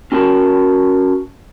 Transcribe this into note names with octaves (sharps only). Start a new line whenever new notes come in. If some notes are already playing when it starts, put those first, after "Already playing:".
C#4 F#4 A#4 A5 B5